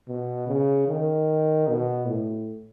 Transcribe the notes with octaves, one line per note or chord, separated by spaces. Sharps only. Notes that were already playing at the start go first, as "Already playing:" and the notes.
B2
C#3
D#3
B2
A2